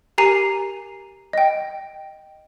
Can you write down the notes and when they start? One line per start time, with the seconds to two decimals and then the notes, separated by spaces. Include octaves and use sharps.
0.18 G4 A#4 G#5 A#5 C7 D#7
1.33 D#5 G5